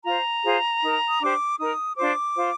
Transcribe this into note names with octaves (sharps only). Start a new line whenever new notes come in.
F4 C5 A#5
F4 G#4 C5
D#4 A#4
D#6
D4 G4 C5 D6
D#4 A#4 D#6
D4 F4 C5 D6
F4 C5